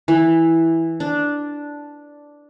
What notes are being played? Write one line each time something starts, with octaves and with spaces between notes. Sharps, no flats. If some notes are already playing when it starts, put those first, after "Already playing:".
E3
D4